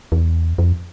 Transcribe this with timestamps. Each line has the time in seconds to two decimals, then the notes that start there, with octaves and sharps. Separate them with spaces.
0.12 E2
0.58 F2